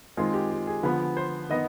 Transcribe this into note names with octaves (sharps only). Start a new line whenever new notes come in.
D#3 G#3 C4 F4
G4
G4
G#4
D3 F3 B3 B4
C5
D#3 B3 D#5